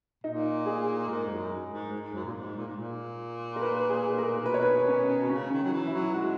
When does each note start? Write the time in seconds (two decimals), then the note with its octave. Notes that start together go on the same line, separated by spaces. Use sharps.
0.24 A#2 D#4
0.66 G#4
1.08 G#2 A#4
1.29 F#2
1.71 G#2
1.92 G#2
2.14 F#2
2.24 A#2
2.35 G#2
2.56 A#2
2.68 G#2
2.77 A#2
3.56 A#4
3.61 B4
3.90 G#4
4.18 A#4
4.45 B2 B4
4.54 C#5
4.63 B4
4.88 C#4
5.30 C#3 C#4
5.51 D#3
5.63 F#3
5.72 E3
5.86 E4
5.93 F#3
6.14 G#3 F#4